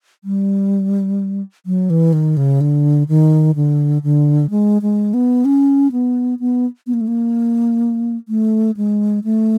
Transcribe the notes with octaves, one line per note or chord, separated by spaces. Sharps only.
G3
F#3
E3
D#3
C#3
D3
D#3
D3
D3
G#3
G#3
B3
C#4
B3
B3
B3
A#3
A3
A#3
A3
G#3
A3